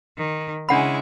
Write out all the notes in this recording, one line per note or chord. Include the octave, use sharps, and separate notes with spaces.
D#3
C#3 G#3 D4 E4 F#5 B5